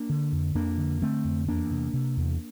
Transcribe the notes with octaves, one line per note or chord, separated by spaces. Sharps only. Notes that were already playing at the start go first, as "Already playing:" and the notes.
Already playing: A#3 D4
D3
F2
F2 A#3 D4
D3
D3 A3 C4
F2
E2 A#3 D4
C3
C3
E2